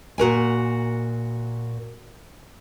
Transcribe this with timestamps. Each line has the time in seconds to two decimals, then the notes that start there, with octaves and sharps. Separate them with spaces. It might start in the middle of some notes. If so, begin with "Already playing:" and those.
0.18 A#2 F#4 A#4 G#5